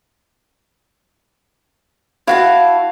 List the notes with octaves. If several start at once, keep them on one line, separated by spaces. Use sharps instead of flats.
E4 F#4 F5 A5